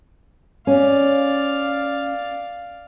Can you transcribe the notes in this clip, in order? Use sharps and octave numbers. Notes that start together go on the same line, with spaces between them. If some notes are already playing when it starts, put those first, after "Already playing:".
C#4 D5 F5